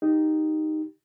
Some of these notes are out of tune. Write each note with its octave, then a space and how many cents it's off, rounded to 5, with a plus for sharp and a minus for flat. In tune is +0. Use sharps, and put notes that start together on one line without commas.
D#4 +0 G4 +5